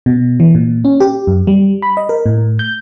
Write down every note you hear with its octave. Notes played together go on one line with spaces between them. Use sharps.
B2
E3
A#2
C#4
G4
F#2
G3
B5
D#5
A#4
A2
G6